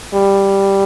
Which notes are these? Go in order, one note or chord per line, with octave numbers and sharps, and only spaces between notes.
G3